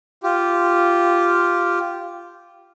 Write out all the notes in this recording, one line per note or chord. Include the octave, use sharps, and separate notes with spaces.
F4 G4